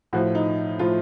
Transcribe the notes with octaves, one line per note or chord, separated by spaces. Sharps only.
A2 F3 F#4
D#4
A2 F3 F4